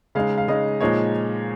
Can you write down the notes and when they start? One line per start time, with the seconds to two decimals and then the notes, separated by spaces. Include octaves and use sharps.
0.15 C#3 G#3 D#4 F5
0.38 F5
0.48 C#3 G#3 D#4 D#5
0.80 A#2 F3 G#3 D#4 C#5